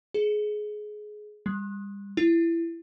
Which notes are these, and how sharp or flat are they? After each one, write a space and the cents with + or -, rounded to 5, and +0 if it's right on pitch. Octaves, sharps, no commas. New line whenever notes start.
G#4 +20
G3 +35
E4 +20